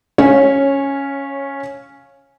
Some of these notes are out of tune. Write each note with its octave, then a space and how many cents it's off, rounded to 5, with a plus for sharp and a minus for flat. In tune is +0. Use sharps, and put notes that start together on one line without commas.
C#4 +0 C#5 -15 F5 +0